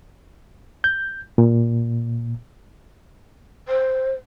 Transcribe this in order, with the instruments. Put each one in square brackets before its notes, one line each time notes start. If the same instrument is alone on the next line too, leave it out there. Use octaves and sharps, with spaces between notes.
[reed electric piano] G6
A#2
[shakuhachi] C5